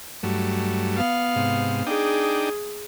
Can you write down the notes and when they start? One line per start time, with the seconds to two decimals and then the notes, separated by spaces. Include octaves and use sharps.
0.23 G2 F#3 A3
0.96 B3 F5
1.36 G#2 C3
1.86 D4 D#4 G#4 G5